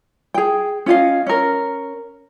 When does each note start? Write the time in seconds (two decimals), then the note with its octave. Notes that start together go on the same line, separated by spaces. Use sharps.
0.34 G#4 G5
0.86 C#4 F4 D#5 F5
1.27 C#4 A#4